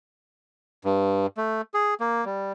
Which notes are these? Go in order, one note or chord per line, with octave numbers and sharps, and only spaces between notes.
G2
A3
G#4
A#3
G3